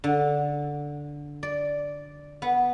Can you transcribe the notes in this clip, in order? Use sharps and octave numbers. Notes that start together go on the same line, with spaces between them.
D3
D5
B3